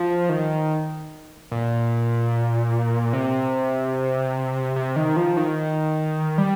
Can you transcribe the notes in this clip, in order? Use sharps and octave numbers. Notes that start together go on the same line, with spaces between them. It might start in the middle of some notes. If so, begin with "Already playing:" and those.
Already playing: F3
D#3
A#2
C3
C3
D#3
F3
D#3
G3